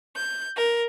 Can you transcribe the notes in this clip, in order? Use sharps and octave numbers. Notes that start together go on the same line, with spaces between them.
G6
A#4